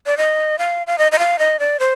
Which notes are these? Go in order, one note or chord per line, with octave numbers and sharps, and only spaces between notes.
D5
D#5
F5
F5
D#5
D#5
F5
D#5
D5
C5